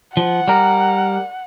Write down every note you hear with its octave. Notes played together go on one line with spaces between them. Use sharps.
F3 F#5
G3 A#4